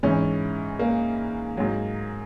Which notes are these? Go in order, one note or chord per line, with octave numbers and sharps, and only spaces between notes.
G#2 E3 C#4
A#3
G#2 F#3